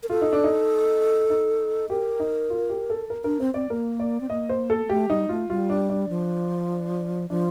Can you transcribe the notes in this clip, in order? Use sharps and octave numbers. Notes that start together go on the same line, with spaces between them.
A#4
F4 A4
D#4
D4
D#4
D#4
G4 A#4
D#4
F4
G4
A4
A#4
D4 A#4
C4 C5
C4 D5
A#3 A#4
D5
C4
A#3 D#5
C5
A4
A#3
A3 G4
G3 D#4
A3 F4
G3 F4
D4
D4
F3
F3 D4